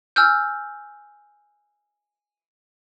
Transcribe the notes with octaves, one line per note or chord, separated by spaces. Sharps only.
G#5 E6 F6 G6